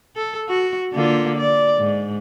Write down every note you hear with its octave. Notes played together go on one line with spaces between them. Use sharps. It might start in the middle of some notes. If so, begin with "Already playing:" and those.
A4
F#4
D3 A#3 F4
D5
G#2